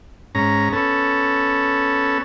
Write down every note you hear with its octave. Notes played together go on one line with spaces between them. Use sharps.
G#2 C#4 A#5
B3 C#4 A4